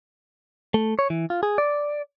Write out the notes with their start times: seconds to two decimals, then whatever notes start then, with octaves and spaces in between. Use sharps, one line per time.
0.74 A3
0.99 C#5
1.10 E3
1.30 F4
1.43 G#4
1.58 D5